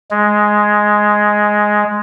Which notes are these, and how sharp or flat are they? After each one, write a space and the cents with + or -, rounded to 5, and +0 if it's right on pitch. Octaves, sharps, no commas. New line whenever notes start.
G#3 +5